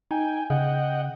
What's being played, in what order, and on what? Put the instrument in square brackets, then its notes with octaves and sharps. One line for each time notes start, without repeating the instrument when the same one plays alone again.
[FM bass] D#4 [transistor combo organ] G5 G#5
[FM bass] C#3 [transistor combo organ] D#5 F#5 G5